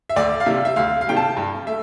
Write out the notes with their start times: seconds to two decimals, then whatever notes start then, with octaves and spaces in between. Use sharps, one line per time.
0.10 E5
0.16 D2 D5
0.40 F5
0.46 C3 G3 E5
0.65 E5
0.76 D2 F5
1.01 F5
1.07 C3 G3 G5
1.17 A5
1.37 G2
1.67 A3 E5